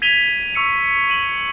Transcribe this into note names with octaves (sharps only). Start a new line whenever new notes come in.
G#6 B6 D#7 F7 G7
C#6 E6 C#7 F7
D#7 F#7